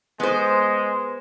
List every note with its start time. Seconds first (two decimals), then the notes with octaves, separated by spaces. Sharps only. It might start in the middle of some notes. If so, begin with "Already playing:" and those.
0.20 G#3 B3 C5